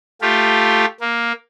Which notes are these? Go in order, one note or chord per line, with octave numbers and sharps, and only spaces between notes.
A3 F4 G4
A#3